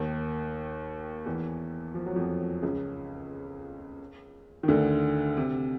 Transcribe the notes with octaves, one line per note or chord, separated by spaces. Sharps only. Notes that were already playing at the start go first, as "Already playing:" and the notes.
Already playing: D#2 D#3
E2 E3
F3
F#3
F2 F3
C#2 C#3
D#3
D2 D3
C3